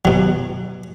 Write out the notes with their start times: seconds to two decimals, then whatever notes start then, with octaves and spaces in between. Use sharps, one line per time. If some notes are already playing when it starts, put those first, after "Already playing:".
0.05 B2 F#3